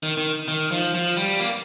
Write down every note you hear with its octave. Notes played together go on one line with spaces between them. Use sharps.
D#3
D#3
D#3
F3
F3
G3
A#3